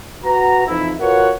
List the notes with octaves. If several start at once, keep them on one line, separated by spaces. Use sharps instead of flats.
F#4 B4 A#5
F2 E3 F3 D#4 E4
F4 F#4 A#4 B4 C#5 F#5